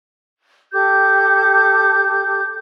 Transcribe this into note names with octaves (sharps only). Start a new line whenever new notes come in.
G4 A4 D6 G6